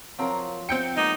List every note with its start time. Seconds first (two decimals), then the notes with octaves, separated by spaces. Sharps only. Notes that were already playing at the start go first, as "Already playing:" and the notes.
0.19 F3 F#3 C4 A#4
0.69 C4 G5 G6 C#7
0.97 G#3 A#3 B3 D#4